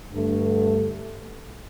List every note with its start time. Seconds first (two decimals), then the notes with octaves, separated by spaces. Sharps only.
0.11 G2 D3 A3